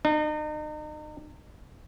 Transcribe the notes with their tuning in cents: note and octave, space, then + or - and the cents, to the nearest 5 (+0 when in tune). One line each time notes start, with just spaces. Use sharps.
D#4 -40